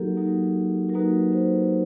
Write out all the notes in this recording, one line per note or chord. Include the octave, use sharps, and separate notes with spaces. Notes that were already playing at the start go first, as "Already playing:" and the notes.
Already playing: F#3 A#3 D#4 F#4 G4 A4 A#4
F#3 A#3 D#4 F#4
A#4
F#3 A#3 D#4 F#4 B4
C5